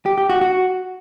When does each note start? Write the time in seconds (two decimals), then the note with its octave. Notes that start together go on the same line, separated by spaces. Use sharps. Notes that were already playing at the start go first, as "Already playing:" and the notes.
0.06 G4
0.18 G4
0.30 F#4
0.41 F#4